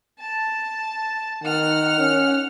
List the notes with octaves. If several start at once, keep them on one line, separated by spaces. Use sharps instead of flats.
A5
D#3 F#5 F6
C#4